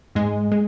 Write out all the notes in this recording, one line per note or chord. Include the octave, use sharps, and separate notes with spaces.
G#2 G#3
G#3